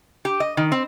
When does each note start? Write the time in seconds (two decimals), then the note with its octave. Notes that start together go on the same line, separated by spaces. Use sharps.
0.25 G4
0.40 D#5
0.57 D#3
0.72 C4